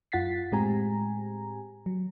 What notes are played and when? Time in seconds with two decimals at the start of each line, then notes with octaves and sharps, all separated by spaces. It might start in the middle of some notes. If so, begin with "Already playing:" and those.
0.12 F#2 F4 F#5 A6 B6 C7
0.52 A2 G#3 C4 G4 G#5 A#5
1.86 F#3